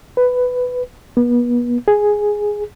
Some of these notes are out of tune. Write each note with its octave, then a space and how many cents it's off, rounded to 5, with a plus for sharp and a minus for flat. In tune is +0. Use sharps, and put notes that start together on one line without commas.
B4 +10
B3 -35
G#4 +0